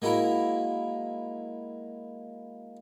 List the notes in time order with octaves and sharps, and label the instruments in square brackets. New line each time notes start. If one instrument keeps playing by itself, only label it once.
[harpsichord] G#3 A#3 E4 F#4 A#4